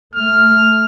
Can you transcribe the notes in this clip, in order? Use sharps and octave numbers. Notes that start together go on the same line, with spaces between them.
A3 F6